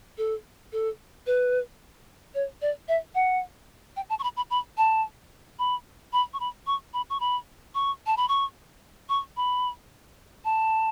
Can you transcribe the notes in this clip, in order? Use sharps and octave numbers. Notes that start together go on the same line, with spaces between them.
A4
A4
B4
C#5
D5
E5
F#5
G5
A5
C#6
B5
B5
B5
A5
B5
B5
C#6
B5
C#6
B5
C#6
B5
C#6
A5
B5
C#6
C#6
B5
A5